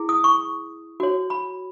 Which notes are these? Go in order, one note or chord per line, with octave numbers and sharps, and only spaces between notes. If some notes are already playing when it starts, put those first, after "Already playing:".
Already playing: E4 G#4
D#6
C#6
F#4 C#5
B5